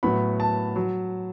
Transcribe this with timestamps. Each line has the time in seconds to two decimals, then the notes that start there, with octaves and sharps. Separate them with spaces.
0.03 A2 F#3 B3 B5
0.40 A5
0.76 F#3